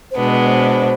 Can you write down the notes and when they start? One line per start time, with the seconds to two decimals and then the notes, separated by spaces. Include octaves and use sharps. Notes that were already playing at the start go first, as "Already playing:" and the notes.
0.11 C5
0.16 B2 G#3 B3 D4 B4
0.32 B4
0.46 C5